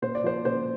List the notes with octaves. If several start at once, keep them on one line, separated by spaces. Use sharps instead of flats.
A#2 C5
D5
F3 C5
A#2 C5